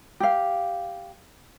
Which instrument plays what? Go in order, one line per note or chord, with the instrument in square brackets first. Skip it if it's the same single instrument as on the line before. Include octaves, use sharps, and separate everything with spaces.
[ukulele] G4 F5